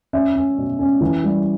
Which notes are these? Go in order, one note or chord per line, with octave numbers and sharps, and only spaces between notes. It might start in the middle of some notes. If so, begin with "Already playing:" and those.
C#4 E5
C#4
B2
C#4
E3
G3